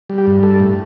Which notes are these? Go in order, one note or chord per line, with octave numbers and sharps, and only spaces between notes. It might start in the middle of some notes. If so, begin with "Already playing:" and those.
G3
G4
G2
G3 A4
A2